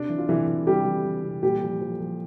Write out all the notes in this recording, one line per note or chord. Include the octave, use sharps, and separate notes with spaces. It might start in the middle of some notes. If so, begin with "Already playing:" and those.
Already playing: C3 D4
E3
F4
C3 E3 E4
E3
C3 G3 G4
E3
E3
C3
A#2 G3 G4
F3
F3
F3